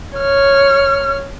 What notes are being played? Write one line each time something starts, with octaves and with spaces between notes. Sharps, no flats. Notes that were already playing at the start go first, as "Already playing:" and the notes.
C#5 F6